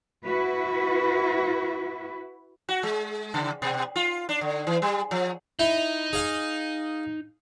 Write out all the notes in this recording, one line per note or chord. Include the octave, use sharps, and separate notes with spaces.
E4 F#4 B4
F#4
G#3
C#3
B2
F4
D4
D3
E3
G3
F3
D#4 E4
G#4 F5 G#5